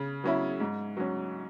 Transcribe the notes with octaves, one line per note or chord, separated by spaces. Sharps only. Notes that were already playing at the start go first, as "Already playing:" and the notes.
Already playing: C#3
F#3 C#4 E4
G#2
F#3 C#4